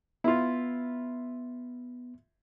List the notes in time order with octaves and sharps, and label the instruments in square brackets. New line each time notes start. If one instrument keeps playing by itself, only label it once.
[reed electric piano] B3 [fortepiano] E4 F4